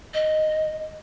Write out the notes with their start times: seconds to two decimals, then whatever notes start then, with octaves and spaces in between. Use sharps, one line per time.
0.14 D#5